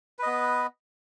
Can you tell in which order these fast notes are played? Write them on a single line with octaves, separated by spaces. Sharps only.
B4 D#5 B3